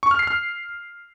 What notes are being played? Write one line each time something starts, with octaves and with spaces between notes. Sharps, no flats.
C#6
F6
C7
F6